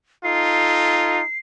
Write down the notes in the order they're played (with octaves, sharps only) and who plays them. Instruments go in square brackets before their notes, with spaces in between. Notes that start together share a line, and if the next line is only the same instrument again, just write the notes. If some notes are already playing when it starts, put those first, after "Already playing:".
[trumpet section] D#4 F4 A4 [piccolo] C7